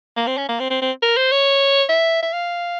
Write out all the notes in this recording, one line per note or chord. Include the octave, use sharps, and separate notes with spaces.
A#3
C4
C#4
A#3
C4
C4
C4
A#4
C5
C#5
E5
E5
F5